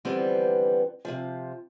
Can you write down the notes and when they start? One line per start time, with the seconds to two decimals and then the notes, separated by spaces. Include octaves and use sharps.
0.05 D3 E3 F3 G3 B3 C4
1.05 C3 F3